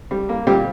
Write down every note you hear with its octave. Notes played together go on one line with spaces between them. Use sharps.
G3
A#3
A#2 G3 G4